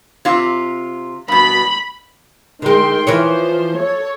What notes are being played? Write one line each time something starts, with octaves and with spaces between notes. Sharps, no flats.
C3 F4
G2 B2 B5
D3 D#3 G#3 G5 C6
E3 F3 A#4 C5 C#5
A4 C#5